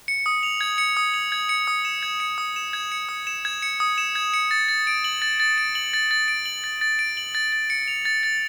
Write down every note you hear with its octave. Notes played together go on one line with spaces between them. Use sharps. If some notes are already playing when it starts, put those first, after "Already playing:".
C#7
D#6
F7
G#6
C#7
D#6
F7
G#6
C#7
D#6
E7
G#6
C#7
D#6
E7
G#6
C#7
D#6
E7
G#6
C#7
D#6
E7
G#6
C#7
A6
A6
D7
F#7
A6
A6
D7
F#7
A6
A6
D7
F#7
A6
A6
D7
F#7
A6
A6
C#7
F7
A6
A6